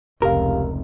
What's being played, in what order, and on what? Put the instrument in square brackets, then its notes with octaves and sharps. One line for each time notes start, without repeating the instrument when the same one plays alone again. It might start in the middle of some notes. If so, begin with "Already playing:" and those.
[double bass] F1 C#2 [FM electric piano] G4 F5 [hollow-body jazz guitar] A#4